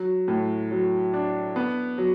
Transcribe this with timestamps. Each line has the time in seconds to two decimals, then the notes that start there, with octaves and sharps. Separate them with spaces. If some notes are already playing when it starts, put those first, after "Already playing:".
Already playing: F#3
0.28 A2
0.71 F#3
1.13 D4
1.56 B3
1.98 F#3